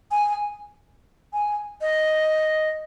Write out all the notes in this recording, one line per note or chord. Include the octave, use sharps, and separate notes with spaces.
G#5
G#5
D#5